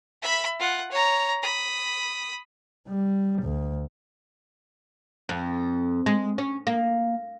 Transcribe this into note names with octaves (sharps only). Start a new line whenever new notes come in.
E5 B5
F4 F#5
C#5 A#5
B5 D#6
G3
D2
F2
G#3
C#4
A#3